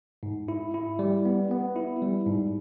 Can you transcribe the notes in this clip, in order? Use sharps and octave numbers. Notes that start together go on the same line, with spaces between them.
G#2
E4
E4
G3
B3
B3
E4
G3
G#2